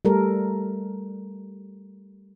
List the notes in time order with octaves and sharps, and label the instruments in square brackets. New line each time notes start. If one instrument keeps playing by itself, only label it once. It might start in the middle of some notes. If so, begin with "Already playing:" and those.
[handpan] G3 A3 A4 A#4